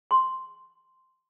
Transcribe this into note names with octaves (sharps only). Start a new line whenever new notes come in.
C6